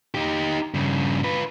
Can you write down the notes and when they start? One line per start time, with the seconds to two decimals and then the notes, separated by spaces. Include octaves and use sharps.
0.14 D#4 G4
0.74 G2 C#3
1.24 F4 B4